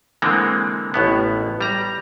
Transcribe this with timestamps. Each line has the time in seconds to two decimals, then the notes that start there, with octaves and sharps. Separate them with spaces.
0.22 D3 E3 G#3 A#3 C4
0.94 A1 A2 B3
1.61 G3 A#5